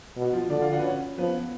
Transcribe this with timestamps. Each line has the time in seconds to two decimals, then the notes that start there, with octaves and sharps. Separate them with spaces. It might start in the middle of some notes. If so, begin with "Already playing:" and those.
0.17 B2
0.24 F#4
0.33 F3 F4
0.50 D3 D4 D5
0.62 F4 F5
0.73 F#4 F#5
0.79 B4
0.84 C#4 C#5
1.18 F3 B3 B4